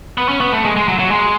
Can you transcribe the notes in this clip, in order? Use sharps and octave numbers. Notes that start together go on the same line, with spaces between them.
B3
C#4
B3
A3
G#3
G#3
F#3
F#3
G#3